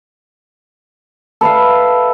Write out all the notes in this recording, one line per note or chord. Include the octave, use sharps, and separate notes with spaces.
A4 B4 E5 F5